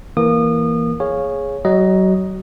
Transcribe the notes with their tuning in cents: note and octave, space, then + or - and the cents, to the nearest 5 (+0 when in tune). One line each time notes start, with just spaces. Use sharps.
E3 +0 A#3 +0 D#6 -30
G#4 +0 C#5 -5 F5 +0
F#3 +30 D#5 +0